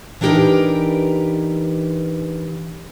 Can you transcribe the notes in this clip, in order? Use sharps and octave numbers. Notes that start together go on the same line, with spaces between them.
E3 D4 D#4 G4 A#4 B4